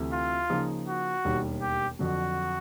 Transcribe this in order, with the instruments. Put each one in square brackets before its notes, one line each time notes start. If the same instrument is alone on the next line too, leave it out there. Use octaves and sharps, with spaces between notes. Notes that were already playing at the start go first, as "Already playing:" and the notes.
Already playing: [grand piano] D2 C3 E3 A3
[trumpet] F4
[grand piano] C#3 F3 A#3 D#4 G#4
[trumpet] F#4
[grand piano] E1 D#2 D#3 G3
[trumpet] G4
[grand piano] F2 D3 F#3 [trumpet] F#4